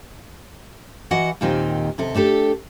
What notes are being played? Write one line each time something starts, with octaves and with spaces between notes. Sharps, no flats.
E3 F#4 D#5 F#5
D#2 A#2 D#3 C4 D#4 G4
D#2 C3 A4
A3 D4 G4 A4